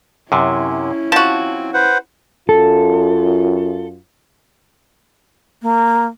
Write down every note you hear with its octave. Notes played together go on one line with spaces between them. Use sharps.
F#2 C3 C#4 E4
F3 C4 F#4 A5
B4 C5 F#5
F#2 F4 A4
A#3